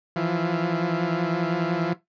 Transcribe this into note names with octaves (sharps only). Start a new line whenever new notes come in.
E3 F3